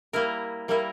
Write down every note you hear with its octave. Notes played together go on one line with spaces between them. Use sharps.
G3 A#3 E4 A#4
G3 A#3 E4 A#4